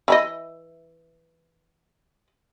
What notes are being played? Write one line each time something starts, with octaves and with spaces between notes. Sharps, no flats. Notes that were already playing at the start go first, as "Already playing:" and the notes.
E3 E4 D#5